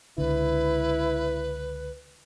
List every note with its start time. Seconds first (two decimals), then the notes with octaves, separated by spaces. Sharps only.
0.18 C#2 D3 E4 B4